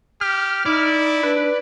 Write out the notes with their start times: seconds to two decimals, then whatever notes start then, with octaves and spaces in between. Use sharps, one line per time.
0.21 G4 F6
0.66 D#4 E4 D5
1.23 D4 B4